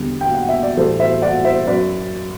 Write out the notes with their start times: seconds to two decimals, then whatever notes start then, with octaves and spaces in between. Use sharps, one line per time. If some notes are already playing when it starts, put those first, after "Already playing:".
Already playing: E2 D3 G3
0.21 G5
0.34 F#5
0.49 E5
0.63 D5
0.77 A2 E3 G3 A4 C5
1.00 C5 E5
1.22 D5 F#5
1.44 C5 E5
1.67 F#2 F#3 B4 D5